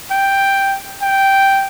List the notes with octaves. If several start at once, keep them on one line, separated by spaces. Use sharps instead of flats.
G5
G5